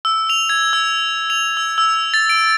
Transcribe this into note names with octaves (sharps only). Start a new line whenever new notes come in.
E6
F7
G#6
E6
F7
E6
E6
A6
D7